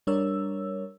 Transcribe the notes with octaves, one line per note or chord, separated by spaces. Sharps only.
G3 D4 A#4 C#5 E6